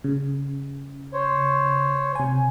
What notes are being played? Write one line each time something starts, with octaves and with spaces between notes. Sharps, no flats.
C#3
C5 C#5
C3 G#5